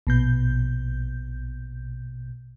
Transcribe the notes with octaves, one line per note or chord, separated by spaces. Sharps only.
A#1 B2 G6